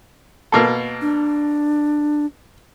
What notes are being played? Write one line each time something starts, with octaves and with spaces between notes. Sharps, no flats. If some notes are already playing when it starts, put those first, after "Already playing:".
B2 A#3 A4
D4